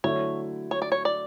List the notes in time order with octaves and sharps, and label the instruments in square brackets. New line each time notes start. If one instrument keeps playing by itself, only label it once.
[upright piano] D3 F#3 A3 E4 [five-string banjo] C#5
[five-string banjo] C#5
D5
C#5
D5